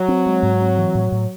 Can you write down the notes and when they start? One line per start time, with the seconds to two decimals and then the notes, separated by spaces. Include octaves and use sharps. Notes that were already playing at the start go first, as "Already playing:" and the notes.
Already playing: F#3
0.08 C4
0.26 G#3
0.43 G#2
0.61 C4
0.77 E3
0.95 A2
1.12 A2